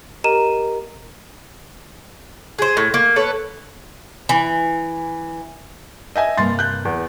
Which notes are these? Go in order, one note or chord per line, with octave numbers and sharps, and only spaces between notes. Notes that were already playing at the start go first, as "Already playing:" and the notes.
G4 A#4 D#5 A#5 D#7 E7
G#4 C5
A2
A#3
A4 B4 C#5
E3
D#5 E5 G#5
G2 C3 A#3 C6 A6
F#6 G6
E2